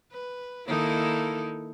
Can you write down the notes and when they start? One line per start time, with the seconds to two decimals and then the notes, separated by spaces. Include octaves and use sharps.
0.12 B4
0.67 D#3 A#3 D#4 E4 A4